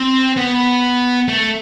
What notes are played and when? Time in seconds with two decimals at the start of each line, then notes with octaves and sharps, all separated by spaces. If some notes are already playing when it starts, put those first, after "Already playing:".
Already playing: C4
0.37 B3
1.28 A3